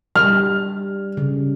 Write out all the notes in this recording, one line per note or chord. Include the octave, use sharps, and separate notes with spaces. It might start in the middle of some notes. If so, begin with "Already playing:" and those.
G3 F6
C#3